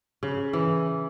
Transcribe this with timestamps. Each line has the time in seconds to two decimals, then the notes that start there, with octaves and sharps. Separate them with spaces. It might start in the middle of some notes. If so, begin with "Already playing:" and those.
0.23 C#3
0.53 E3